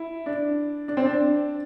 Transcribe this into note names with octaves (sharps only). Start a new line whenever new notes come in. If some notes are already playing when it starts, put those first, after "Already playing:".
Already playing: E4
D4
D4
C4
D4